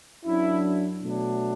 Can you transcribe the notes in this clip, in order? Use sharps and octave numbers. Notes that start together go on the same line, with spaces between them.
F#2 F#3 D4 E4
B2 F#3 A3 D4